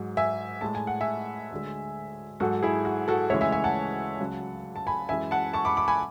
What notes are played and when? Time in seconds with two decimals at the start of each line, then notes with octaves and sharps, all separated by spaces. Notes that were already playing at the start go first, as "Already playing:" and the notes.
Already playing: G#2 F#3
0.17 E5 G#5
0.61 A2 G#3 A5
0.75 G#5
0.87 F#5
1.01 E5 G#5
1.51 D2 D3 G#3
2.40 G#2 F#3 F#4 A4
2.63 E4 G#4
2.85 F#4
3.08 F#4 A4
3.30 D2 C#3 E3 G#3 C#5 E5
3.41 E5 G#5
3.52 E5 G#5
3.64 F#5 A5
4.20 C#2 C#3 F#3
4.76 A5
4.87 G#5 B5
5.09 F#2 E3 G#3 E5 G#5
5.31 F#5 A5
5.53 A5 C#6
5.65 B5 D6
5.77 B5 D6
5.88 G#5 B5